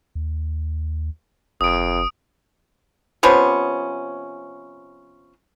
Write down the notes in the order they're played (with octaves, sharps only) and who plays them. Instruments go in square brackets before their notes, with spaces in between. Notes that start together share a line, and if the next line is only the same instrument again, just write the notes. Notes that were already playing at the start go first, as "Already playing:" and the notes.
[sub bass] D#2
[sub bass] F#1 [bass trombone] F2 [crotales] D#6 D7
[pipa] C3 F3 B3 C#4